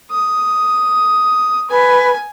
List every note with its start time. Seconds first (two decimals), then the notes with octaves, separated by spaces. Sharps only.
0.11 D#6
1.70 B4 G#5